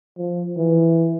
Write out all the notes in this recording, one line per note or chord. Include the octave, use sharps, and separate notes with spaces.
F3
E3